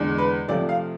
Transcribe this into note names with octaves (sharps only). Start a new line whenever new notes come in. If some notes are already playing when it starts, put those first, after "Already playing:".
Already playing: E2 D3 G#3 D4
B4
C3 F3 A3 D5
F5